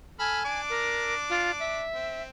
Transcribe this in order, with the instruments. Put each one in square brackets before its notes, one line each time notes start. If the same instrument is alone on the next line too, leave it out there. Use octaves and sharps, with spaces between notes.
[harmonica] A4 B5 F6 [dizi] G#5
[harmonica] D4 D6
[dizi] A#4
F4
E5
[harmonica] C4